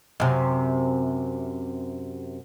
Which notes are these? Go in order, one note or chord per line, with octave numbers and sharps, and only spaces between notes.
F#2 C3